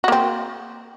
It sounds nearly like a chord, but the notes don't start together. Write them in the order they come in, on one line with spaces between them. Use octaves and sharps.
F#4 A#3 C4